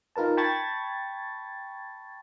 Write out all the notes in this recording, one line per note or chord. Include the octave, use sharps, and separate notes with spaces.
D#4 F4 A#4 B4 A5
G5 A5 B5 C#6 G#6 A6